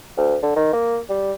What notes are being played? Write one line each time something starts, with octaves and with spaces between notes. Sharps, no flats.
D2
D3
D#3
A#3
G3